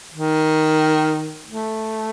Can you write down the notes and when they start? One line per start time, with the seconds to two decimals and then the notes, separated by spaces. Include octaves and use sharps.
0.14 D#3
1.47 A3